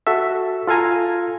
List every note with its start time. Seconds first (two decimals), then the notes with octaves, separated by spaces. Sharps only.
0.07 F#4 A4 E5
0.67 F4 A4 F5 G#5 A#5